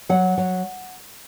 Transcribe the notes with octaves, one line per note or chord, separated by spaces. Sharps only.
F#3 F#5
F#3